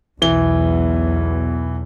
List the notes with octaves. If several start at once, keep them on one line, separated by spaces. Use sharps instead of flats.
B1 E2 E3 G7